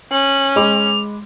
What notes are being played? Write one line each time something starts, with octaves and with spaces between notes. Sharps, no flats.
C#4 F#7
G#3 B5 D6 F7